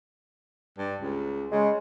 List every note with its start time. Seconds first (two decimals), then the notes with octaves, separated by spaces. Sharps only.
0.78 G2
1.01 C#2
1.52 C#3 G#3